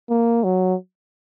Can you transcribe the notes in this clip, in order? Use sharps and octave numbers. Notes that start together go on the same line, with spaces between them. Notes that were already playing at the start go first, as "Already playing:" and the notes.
A#3
F#3